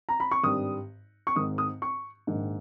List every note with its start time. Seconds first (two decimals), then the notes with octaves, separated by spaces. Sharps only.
0.09 A#5
0.20 B5
0.31 C#6
0.43 G#1 G2 G3 D#6
1.27 C#6
1.36 G#1 G#2 D#3 D#6
1.58 D#6
1.82 C#6
2.27 A#1 G#2 D#3